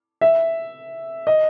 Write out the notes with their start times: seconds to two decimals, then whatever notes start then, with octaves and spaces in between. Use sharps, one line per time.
0.21 E5
1.27 D#5